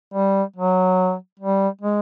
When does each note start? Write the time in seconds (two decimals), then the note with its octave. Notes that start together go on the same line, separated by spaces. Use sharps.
0.14 G3
0.56 F#3
1.39 G3
1.81 G#3